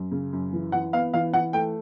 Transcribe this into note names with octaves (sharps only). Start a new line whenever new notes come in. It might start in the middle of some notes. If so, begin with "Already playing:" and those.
Already playing: F#2
C#3
F#2
E3
E3 F#5
B3 F5
E3 F5
E3 F#5
A3 G5